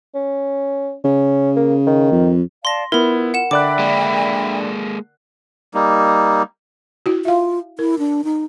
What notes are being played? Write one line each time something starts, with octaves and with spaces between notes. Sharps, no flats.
C#4
C#3 C#4
A#3
D#3
F2
D5 F5 A5 C6 A#6
B3 E4 F4 A#4 B5
F#5 E7
D3 D5 E5 G5 B5 D6 F#6
G#3 A#3
G3 A#3 D#4
E4 F#4
F4 E5 F5
E4 A#4
D4
D#4